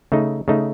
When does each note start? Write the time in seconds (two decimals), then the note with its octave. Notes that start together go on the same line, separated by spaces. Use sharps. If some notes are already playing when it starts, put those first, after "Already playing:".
0.12 C#3 A3 D#4
0.48 C#3 A3 D#4